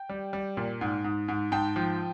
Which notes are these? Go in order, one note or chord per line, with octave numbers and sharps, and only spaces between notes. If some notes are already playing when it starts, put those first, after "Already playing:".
Already playing: G5
G3
G3
A#2
G#2
G#2
G#2
G#2 G5 A5
F3